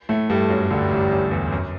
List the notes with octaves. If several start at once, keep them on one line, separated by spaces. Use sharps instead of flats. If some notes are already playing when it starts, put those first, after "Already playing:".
A2 A3
G2 G3 A3
F#2 F#3
D2 D3 G3
A1 A2
F#2
E2
F#2